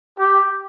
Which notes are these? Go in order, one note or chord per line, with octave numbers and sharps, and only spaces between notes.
G4